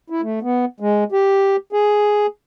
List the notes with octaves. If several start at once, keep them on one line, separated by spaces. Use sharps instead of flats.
E4
A3
B3
G#3
G4
G#4